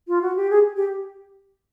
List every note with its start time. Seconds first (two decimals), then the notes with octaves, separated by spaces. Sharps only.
0.08 F4
0.22 F#4
0.36 G4
0.50 G#4
0.76 G4